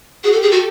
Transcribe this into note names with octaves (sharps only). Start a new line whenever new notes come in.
F#4 G#4
A4
G4
G#4
F#4 A4